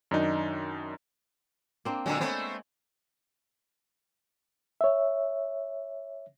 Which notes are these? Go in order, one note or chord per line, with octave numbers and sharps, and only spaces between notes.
F#2 D#3 D4 D#4
A#3 C4 D4
A#2 D3 F#3 G#3
A3 B3 C4 C#5
C#5 E5